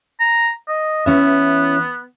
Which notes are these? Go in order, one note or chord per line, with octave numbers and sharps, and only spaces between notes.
A#5
D#5
E3 B3 C#4 E5